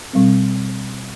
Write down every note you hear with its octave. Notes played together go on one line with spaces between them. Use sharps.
B2 G3 C4